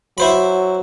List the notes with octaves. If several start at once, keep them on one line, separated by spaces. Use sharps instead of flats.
F#3 E4 C5 B5